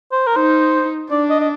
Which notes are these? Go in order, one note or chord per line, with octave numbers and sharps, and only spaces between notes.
C5
A#4
D#4 C5
D4 D5
D#5
D#5